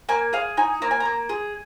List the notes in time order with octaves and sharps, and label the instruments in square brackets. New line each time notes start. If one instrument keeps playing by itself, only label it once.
[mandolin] A#3 G#5
G#4 F5
D#4 G#5
A#3 A#5
G#5
A#5
A#3
G#4